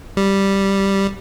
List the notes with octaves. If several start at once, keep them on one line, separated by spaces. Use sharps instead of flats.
G3